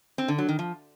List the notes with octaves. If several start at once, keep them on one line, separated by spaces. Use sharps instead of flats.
C4
D3
F#3
D#3
F3